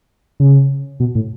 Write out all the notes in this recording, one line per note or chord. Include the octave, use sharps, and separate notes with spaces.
C#3
B2
A2